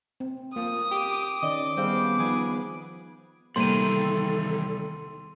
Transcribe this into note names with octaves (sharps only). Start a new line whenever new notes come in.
C4
F3 A#3 D#6
G4 D6
D#3 C#4 D5 D#5
G3 B3 C4 G#4 F5
F3 D#4 G#4
E2 C3 D#3 G3 A#3 A4 C6 D#7